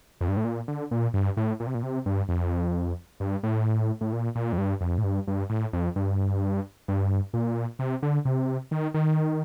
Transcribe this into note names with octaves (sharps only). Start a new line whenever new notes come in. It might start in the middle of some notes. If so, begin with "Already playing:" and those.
F2
G2
A2
A#2
D3
A#2
G2
A2
A#2
C3
A#2
C3
G2
F2
G2
A2
A2
A#2
A#2
F2
G2
F2
A2
G2
G2
A2
F2
G2
G2
A#2
C3
D3
C3
D#3
D#3